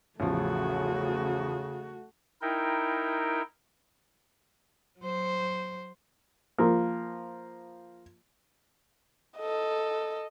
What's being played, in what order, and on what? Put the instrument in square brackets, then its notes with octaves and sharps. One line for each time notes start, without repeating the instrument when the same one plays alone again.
[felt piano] A1 E2 F3 [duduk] C#3 [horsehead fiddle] A3 F#4
[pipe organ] D#4 E4 A#4 G5
[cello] F#3 C5
[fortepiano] F3 A#3
[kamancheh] A4 D#5